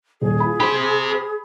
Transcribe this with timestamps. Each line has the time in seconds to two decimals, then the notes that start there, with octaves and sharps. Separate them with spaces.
0.21 D#1 G#4
0.40 F4 B5
0.60 G4 C5 B5